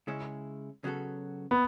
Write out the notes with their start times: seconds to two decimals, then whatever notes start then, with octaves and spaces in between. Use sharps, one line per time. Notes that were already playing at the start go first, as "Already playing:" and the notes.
0.07 C#3 G#3 C#4 E4
0.84 C#3 F#3 B3 F#4 A4
1.51 B3